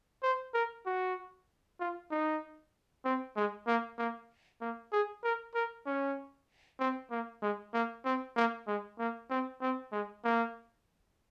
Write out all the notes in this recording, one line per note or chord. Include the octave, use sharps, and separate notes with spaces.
C5
A#4
F#4
F4
D#4
C4
G#3
A#3
A#3
A#3
G#4
A#4
A#4
C#4
C4
A#3
G#3
A#3
C4
A#3
G#3
A#3
C4
C4
G#3
A#3